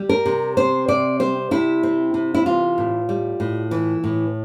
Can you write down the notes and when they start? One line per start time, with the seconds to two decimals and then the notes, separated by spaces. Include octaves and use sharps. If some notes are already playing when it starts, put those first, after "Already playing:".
Already playing: G3
0.09 A#4
0.26 C3
0.57 C4 C5
0.88 C3 D5
1.20 G3 C5
1.51 C3 E4
1.83 C4
2.14 C3
2.35 E4
2.46 E3 F4
2.78 A2
3.09 G3
3.40 A2
3.71 E3
4.04 A2